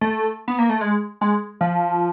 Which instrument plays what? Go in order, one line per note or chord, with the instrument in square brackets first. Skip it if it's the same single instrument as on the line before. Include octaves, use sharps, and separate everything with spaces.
[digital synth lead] A3
B3
A#3
A3
G#3
G#3
F3